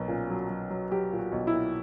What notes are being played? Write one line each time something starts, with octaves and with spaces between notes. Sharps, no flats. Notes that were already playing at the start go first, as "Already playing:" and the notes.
Already playing: B1 F#3 A#3
A#2 C#4
F#3
F#3
F#3
F#3 G4
A#2
F#4
B1
E4
A#2